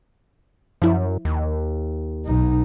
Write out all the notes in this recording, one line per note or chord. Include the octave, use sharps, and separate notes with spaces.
F#2 F3 E4
D#2
B1 D#4